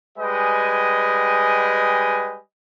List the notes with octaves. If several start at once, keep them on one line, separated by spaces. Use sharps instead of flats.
G3 G#3 B4 D#5 G5 G#5